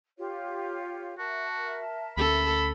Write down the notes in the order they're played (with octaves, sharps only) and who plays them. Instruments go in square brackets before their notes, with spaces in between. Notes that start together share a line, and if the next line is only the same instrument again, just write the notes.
[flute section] F4 G4 C#5
[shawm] F#4 [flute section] A#4 E5 A5
[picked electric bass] D2 C#4 [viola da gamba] A4 [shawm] B5